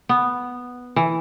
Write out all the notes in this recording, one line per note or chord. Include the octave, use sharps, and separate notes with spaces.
B3
E3